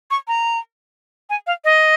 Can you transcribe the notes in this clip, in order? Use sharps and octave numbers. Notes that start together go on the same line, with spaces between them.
C#6
A#5
G#5
F5
D#5